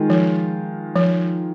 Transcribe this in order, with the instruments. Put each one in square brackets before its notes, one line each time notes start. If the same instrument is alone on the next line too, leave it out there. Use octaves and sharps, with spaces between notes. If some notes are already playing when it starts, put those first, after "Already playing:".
Already playing: [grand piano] D#3 G#3 F4
[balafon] F3
F3